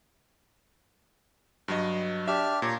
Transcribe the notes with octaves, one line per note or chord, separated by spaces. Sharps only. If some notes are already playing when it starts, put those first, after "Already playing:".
G2 F#3 D#5
D4 G4 E5 F6
A#2 C#5 A#5